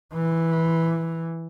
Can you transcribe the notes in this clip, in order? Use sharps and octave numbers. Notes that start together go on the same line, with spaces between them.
E3